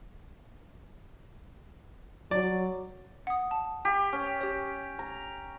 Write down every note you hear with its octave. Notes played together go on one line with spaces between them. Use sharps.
F#3 D5
F#5 D#6
A5
G4
C#4
G4 C#5
A#5